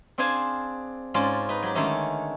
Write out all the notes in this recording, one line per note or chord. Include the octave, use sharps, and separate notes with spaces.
C4 D4 G#4 C5 F5 G#5
G#2 C#4 F4 D5 A5
D#4 B4
F#3 G4
D3 D#3 G#3 A3 C#4 D#4